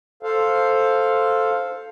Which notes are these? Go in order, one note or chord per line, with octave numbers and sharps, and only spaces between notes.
A4 C5 F5